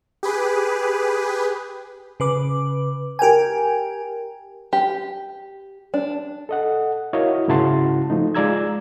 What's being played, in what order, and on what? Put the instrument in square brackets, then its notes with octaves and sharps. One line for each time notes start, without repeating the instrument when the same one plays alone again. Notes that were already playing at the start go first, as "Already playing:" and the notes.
[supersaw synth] G4 G#4 B4
[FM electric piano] C#3 B4 D6
G4 A#4 G5 G#5
[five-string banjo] G4
D4
[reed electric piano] A4 D#5 F#5
E4 F#4 A#4 C#5 D#5 F5
G#2 C#3 E4 F#4 A5 C6
F3 A3 D#4
G#3 F4 D5 A#5 E6 G#6